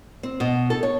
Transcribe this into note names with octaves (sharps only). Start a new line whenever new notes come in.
C4
B2
A4
C#5